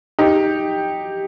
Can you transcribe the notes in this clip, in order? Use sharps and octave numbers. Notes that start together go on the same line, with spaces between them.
D#4 G4